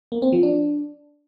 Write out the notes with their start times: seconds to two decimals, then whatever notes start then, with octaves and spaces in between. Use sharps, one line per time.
0.12 A#3
0.22 C4
0.33 F3
0.43 D4